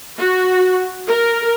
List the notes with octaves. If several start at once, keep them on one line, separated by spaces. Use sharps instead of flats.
F#4
A#4